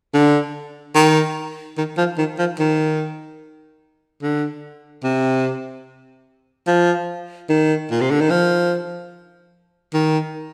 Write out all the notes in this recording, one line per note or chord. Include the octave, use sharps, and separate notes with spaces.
D3
D#3
D#3
F3
D#3
F3
D#3
D3
C3
F3
D#3
A#2
C3
D3
D#3
F3
D#3